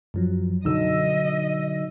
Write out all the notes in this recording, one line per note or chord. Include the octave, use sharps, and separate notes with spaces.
F#2 F3 F#3
B2 D3 F#3 D#4 D#5 E6